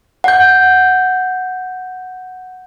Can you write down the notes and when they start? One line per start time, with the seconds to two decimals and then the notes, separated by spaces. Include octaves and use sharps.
0.24 F#5 G6